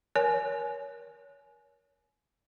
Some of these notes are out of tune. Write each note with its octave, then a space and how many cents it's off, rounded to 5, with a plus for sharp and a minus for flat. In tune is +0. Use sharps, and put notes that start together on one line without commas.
A#4 +30 C#5 +20 G#5 +25